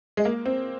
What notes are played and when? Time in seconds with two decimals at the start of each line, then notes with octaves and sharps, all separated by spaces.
0.17 G#3
0.25 A#3
0.46 C4